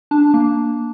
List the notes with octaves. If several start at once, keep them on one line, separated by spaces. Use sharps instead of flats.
D4 A5
A#3